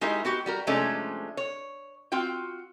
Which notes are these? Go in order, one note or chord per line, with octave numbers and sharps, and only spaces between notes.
G#3 D#4 E4 F#4 G4 A#4
B3 F#4 G4
G3 F#4 A#4
C3 F3 G#3 A3 C#4 D4
C#5
C4 F4 F#4 G5